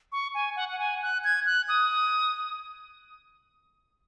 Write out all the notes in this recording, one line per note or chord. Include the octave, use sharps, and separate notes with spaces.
C#6
G#5
F#5
F#5
G#5
F#6
G#6
F#6
D#6